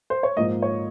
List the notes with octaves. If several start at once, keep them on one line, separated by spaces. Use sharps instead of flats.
C5
C#5
G#2 F3 A#3 D#5
C#5